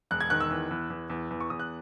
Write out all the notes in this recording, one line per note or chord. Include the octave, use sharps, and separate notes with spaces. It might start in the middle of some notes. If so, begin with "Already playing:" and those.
E1 F#6
G#6
D#3 F#6
E6
E2
E2
E2
E2
E2
C#6
E2 D#6
F#6